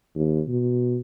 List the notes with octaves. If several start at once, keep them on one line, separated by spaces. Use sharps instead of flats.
D#2
B2